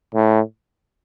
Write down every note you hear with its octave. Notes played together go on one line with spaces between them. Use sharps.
A2